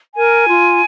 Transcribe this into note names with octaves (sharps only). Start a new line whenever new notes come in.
A#4 G#5
F4